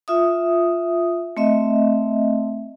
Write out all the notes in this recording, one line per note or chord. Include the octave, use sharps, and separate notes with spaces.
F4 E5 D#6
A3 C4 D#5 E5